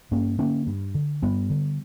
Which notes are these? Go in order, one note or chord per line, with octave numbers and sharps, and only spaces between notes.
G2 A#3 C#4
D3 A#3 C#4
G2
D3
G2 G3 B3
D3